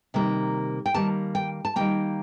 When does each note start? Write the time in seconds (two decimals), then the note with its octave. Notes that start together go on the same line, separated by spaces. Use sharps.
0.14 C3 D#3 G3 A#3
0.86 G5
0.94 D#3 G3 A#3 A5
1.35 G5
1.65 A5
1.76 D#3 G3 A#3 G5